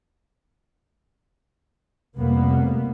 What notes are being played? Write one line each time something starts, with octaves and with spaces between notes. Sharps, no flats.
F1 G3 A#3 B3